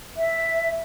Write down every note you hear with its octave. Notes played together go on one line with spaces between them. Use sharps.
E5